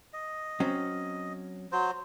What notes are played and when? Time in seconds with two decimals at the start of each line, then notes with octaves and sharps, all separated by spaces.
0.13 D#5
0.60 F#3 C4 C#4
1.72 F#3 C5